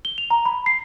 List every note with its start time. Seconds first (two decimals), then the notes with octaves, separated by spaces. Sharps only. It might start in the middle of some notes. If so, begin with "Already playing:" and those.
0.05 G7
0.18 F7
0.30 A#5
0.45 B5
0.66 C7